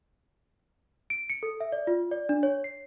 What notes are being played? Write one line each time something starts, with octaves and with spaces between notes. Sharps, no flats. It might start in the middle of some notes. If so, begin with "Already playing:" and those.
D7
C#7
A4
E5
D5
F4
D5
D4
C#5
C7